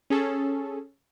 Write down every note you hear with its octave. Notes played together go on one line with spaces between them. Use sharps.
C#4 G#4 A4